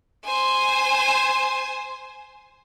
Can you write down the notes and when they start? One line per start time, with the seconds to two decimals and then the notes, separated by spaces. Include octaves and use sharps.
0.24 C5 G#5